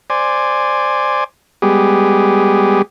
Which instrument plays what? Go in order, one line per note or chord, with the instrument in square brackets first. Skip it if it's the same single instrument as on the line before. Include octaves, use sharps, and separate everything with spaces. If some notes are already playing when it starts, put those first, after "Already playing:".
[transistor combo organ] C5 D5 G#5
G3 G#3 B3 G4 G#4